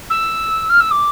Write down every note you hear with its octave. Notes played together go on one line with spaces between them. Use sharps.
E6
F6
E6
D6